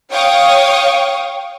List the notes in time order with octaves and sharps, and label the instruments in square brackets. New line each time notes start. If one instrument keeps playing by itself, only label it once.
[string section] C#5 F5 G5 C#6 D#6